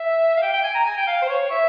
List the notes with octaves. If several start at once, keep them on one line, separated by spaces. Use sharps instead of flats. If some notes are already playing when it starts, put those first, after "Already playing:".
Already playing: E5
F5
G5
G5
G#5
A#5
G#5
G5
F5
C5
C#5
E5